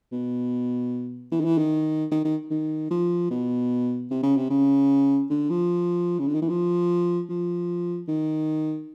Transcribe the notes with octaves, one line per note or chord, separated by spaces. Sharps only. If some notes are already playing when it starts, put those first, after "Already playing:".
B2
E3
D#3
E3
D#3
D#3
D#3
D#3
F3
B2
C3
C#3
C3
C#3
D3
F3
C#3
D3
D#3
E3
F3
F3
D#3